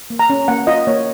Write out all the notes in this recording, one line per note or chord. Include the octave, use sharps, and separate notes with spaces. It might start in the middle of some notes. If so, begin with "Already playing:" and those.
A#3
A#5
C#4
A#3 F#5
F4 D#5
A#3 C#5